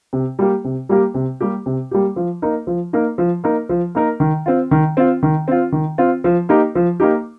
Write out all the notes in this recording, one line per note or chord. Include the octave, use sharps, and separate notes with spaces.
C3
G3 A#3 G4
C3
G3 A#3 G4
C3
G3 A#3 G4
C3
G3 A#3 G4
F3
A#3 D#4 A#4
F3
A#3 D#4 A#4
F3
A#3 D#4 A#4
F3
A#3 D#4 A#4
D#3
C4 F4
D#3
C4 F4
D#3
C4 F4
D#3
C4 F4
F3
A#3 D#4 G4
F3
A#3 D#4 G4